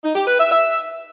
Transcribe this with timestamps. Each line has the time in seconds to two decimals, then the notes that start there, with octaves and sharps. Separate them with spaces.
0.04 D#4
0.16 G4
0.27 B4
0.39 E5
0.51 E5